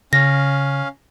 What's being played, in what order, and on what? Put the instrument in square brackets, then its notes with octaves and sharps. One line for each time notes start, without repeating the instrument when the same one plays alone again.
[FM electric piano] C#3 [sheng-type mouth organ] C#4 F5 [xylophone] A#6